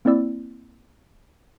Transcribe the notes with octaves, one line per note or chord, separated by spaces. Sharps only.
A#3 C4 E4 D5 E6